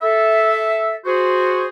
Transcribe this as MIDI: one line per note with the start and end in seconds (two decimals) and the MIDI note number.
0.02 0.95 69
0.02 0.95 76
1.06 1.67 66
1.06 1.67 68
1.06 1.67 72